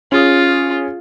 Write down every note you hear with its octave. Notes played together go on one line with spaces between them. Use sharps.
C#4 F4 G#4 D#6